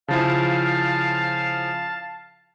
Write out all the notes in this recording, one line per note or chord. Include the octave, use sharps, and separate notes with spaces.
C#3 F3 E4 F5 A5